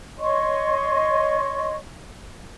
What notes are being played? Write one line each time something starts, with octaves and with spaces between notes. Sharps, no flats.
C#5 D#5 C6 C#6